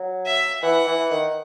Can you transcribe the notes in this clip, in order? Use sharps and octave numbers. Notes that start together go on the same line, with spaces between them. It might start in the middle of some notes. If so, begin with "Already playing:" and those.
Already playing: F#3
E5
E3 F#5
E3
D#3